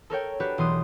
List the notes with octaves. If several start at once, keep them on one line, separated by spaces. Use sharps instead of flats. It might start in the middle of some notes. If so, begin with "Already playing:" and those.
A4 A#4 C#5 G5
D4 F#4 G4 B4
B1 E3 C6 D#6